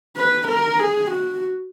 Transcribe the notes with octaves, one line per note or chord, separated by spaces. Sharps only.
B4
A#4
G#4
F#4